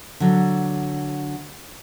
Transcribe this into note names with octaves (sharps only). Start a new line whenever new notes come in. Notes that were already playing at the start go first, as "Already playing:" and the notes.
D3 F#3